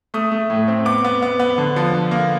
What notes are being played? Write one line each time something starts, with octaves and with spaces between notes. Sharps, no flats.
A3 D#6
A3
A2
C4
B3 D6
B3
B3
B3
D3
F3
D3
A#3